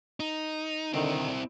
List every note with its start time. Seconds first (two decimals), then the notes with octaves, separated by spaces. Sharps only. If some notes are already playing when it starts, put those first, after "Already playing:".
0.20 D#4
0.93 D3 D#3 C4 E4